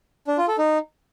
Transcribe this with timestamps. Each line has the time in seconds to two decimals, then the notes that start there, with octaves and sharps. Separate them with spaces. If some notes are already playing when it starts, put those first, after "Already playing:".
0.28 D4
0.38 F4
0.48 A4
0.58 D#4